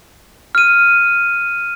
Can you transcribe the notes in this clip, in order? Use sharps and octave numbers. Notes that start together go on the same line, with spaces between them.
F6 D#7